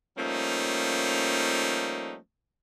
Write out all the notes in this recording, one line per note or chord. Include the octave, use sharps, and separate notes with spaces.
F3 G3 A3 A#3 C#4 D#4